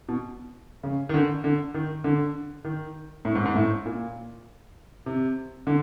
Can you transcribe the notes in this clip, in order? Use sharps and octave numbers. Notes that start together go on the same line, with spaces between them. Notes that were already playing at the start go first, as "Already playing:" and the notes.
B2
C#3
D#3
D3
D3
D#3
D3
D#3
A2
G#2
G#2
A2
A#2
C3
D3